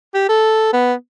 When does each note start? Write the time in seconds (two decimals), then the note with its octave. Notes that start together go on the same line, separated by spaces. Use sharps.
0.14 G4
0.29 A4
0.73 B3